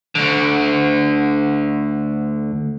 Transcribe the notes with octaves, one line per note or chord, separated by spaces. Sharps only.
D2 D3